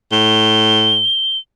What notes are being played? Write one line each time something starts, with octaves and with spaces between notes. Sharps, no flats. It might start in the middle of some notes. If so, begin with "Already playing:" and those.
A2 G7